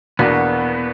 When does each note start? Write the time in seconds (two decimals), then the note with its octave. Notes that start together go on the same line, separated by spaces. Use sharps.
0.19 E2 B2 A#3 B3 D4 F#4